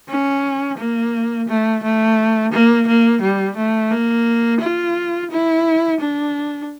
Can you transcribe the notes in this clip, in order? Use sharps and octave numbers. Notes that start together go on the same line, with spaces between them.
C#4
A#3
A3
A3
A#3
A#3
G3
A3
A#3
F4
E4
D4